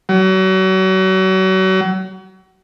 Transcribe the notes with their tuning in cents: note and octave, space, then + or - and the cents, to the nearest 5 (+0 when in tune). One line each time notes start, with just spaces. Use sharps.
F#3 +35